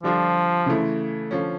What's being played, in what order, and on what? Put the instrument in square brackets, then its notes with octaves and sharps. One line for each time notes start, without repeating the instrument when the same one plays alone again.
[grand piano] D3 G3 D4 F4 [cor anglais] F3
[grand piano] C#3 E3 A3 E4
D3 F3 C#4